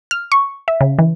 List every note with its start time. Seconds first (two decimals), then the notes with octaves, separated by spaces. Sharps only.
0.11 F6
0.32 C#6
0.68 E5
0.81 C#3
0.99 E3